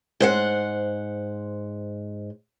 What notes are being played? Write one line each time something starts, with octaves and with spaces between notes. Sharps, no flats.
G#2 C5 F#5